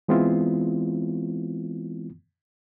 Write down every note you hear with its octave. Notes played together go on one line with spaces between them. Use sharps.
E3 G#3 B3 C4 E4 F4